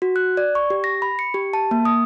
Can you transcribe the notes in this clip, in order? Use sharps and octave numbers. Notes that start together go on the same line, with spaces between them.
F#4
F#6
D5
C#6
G4
A#6
B5
C#7
G4
A5
A#3
D#6